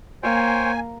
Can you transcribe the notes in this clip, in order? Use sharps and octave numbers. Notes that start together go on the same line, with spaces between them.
A#3 C5 C#5 G5 G#5